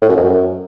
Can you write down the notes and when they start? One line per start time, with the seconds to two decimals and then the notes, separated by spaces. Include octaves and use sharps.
0.02 A2
0.09 F#2
0.16 F2
0.23 F#2